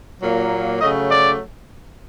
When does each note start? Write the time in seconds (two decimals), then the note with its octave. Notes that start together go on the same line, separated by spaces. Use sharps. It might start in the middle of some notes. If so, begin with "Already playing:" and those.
0.21 A#2 F#3 A#3
0.81 C#3 F#3 A3 D#5
1.11 D5